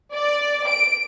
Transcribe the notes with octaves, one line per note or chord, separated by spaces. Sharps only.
D5
D7